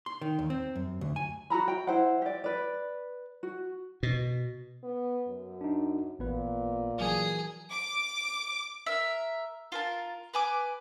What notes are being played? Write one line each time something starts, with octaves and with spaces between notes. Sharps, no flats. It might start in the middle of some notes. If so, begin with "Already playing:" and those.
C6
D#3
D#2
C4
F#2
D2
G#5
F#4 A4 A#5 B5
G5
E4 C5 F#5
G4 D5
B4 D5
F#4
B2
B3
F#2
D4 D#4
A1 A#2 B3 B4
E3 F#3 G#4 A#4
D6
A#4 E5
F4 A#4 A5
B4 G#5 D6